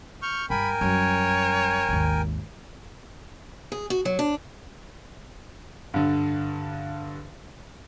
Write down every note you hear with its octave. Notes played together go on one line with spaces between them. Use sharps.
C#6 F6 G6
G2 A#4 G5 G#5 B5
F#2 G3 C#5
G#1 D#2
G#4
F#4
F#3
D4
G2 D3